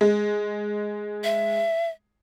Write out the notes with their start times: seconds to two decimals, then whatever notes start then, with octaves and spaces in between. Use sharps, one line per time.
0.01 G#3
1.24 E5